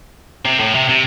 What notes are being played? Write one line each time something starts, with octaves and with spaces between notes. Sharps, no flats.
C3
A2
C3
C3